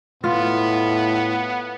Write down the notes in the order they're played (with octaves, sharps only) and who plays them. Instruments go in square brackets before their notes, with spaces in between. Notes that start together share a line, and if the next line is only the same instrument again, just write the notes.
[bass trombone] A2 [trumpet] B3 [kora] F4